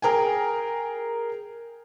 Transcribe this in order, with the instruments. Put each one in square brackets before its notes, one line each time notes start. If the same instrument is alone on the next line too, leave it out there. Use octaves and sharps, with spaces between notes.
[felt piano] G#4 A#4 G5 G#5